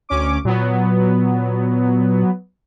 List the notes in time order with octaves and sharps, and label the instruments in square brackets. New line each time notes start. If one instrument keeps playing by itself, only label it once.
[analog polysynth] D2 C#4 D6
[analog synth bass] A#2 [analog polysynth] F#3 B3